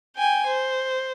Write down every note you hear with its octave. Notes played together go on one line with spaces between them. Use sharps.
G5 G#5
C5